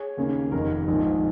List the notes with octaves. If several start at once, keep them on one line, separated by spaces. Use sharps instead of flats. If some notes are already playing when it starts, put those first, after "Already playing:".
Already playing: G#4 C#5
D#2 C#3 A#3 C#4
F1 D#2 D#3 A#4
A#1 G#2 D#3